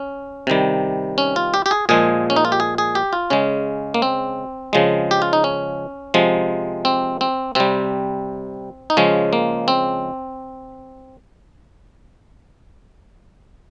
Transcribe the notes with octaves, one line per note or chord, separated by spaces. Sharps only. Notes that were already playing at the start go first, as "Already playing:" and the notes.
Already playing: C#4
C3 D#3 G3
C#4
F4
G4
G4
G#4
A#2 F3 G#3 G#4
C#4
D#4
F4
G4
G#4
G#4
G4
F4
C#3 G#3 C#4
A#3
C4
C#3 F3 G#3
G4
F4
D#4
C#4
C3 F3 G#3
C4
C4
C3 G3 C4
D#4
C#3 F3 G#3 C#4
A#3
C4